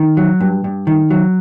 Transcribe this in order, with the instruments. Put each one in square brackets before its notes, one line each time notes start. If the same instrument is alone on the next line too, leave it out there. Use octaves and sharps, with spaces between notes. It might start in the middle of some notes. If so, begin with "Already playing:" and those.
Already playing: [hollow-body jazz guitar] D#3
F#3
G2
G2
D#3
F#3